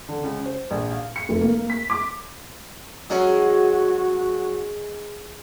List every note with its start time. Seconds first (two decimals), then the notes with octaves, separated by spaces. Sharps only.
0.09 D3
0.23 C#2
0.46 C5
0.71 A#1
0.91 F5
1.16 C#7
1.29 F1
1.41 A#3
1.70 B6
1.90 D6
3.10 F#3 G#3 C#4 F#4